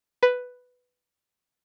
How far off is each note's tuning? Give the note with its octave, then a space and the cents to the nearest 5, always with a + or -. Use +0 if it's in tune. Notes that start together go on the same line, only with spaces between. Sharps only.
B4 +5